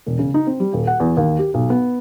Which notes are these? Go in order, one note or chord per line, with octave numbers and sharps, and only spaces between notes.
E1
C#3
D#4
C4
G3
D#1
F#5
E2
D#2
G4
B1
B3